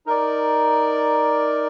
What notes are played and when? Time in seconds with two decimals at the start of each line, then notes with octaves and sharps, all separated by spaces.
0.06 D#4 A#4 D5